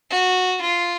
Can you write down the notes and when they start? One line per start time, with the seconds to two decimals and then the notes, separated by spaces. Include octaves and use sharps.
0.11 F#4
0.62 F4